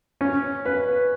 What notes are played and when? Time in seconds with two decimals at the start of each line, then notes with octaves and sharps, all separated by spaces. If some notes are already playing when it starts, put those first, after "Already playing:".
0.21 C#4
0.66 B4